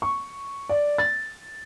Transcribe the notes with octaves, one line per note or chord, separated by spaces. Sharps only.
C#6
D5
A6